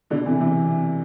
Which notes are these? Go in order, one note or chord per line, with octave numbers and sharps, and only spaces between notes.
B2 D3
C3 E3
C3 E3